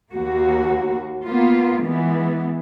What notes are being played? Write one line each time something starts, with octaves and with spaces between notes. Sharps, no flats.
D#2 A#3 F#4
A#3 B3 F4
E3 G#3 B3